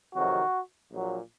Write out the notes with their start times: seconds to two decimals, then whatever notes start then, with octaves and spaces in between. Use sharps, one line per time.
0.15 F2 C3 D#3 F#3 F#4
0.91 A#1 A#2 F#3